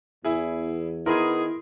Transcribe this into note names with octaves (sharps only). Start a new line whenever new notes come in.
E2 E4 G#4
D#3 B3 E4 G#4 A#4 C6